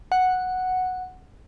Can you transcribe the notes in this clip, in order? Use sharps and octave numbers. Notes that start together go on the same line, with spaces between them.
F#5